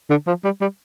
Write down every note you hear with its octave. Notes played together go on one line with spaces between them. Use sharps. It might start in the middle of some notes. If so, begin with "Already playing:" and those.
D3
F3
G3
G3